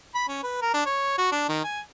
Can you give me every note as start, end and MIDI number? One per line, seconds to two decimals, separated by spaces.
0.15 0.26 83
0.29 0.39 61
0.44 0.59 71
0.62 0.74 70
0.74 0.82 62
0.86 1.18 73
1.18 1.28 66
1.32 1.45 62
1.49 1.63 51
1.64 1.80 80